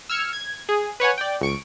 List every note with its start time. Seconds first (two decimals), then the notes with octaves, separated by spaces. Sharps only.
0.09 E6 F6 G#6 C#7
0.33 G#6
0.69 G#4
1.00 B4 C#5 F#5 G#5
1.18 D5 G5
1.41 C#2 C#6 D7